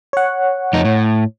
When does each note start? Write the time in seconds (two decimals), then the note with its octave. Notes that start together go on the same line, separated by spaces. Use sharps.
0.13 C#5 F#5
0.73 F2 D#4
0.85 A2